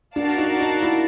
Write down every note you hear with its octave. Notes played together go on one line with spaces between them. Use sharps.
D4 F#4 A#4 D5 F5 A5
D#4
D#4
E4